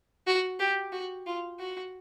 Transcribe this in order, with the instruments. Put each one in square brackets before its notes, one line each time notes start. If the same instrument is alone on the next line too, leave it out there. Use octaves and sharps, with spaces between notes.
[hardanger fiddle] F#4
G4
F#4
F4
F#4